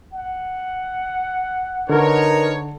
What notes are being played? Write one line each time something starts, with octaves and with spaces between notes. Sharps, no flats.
F#5
D3 D#4 A#4 B4 C#5